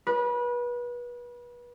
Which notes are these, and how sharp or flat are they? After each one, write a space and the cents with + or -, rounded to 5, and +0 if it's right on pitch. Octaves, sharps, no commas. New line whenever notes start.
B4 -30